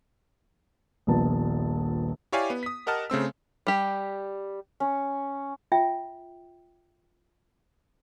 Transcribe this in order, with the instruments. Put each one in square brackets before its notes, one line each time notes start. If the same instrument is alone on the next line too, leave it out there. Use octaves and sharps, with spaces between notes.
[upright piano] D#1 A#1 B3 A5
[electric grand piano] E4 G4 C#5 D5 F5 G#5
B3
D#6 B6
G4 A#4 D#5 F#5 A5 F6
C#3 A3 C4 E6
[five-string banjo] G3 G4
[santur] C#4
[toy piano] F4 E5 G5